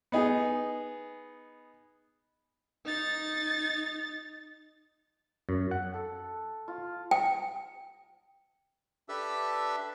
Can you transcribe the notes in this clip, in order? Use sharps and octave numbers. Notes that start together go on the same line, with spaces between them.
B3 D#4 G#4
D#4 A6
F#2
F#5
A4
F4
G5
D4 G4 A4 B4 E5 E6